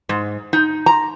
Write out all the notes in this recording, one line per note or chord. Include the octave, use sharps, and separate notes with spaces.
G#2
D#4
A#5